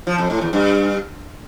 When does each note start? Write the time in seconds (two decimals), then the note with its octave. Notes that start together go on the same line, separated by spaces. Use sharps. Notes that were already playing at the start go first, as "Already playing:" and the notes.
0.07 F3
0.18 F2
0.30 A2
0.41 E2
0.53 G2